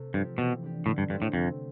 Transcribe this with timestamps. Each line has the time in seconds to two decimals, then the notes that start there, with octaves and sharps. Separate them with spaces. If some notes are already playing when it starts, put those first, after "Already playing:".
Already playing: C3 A3
0.14 G2 F3 C4 G4
0.38 B2 E3
0.62 B3 D4 G4
0.86 A2 D3
0.98 G2
1.10 G2 A3 C4 G4 C5
1.22 A2
1.33 F2 C3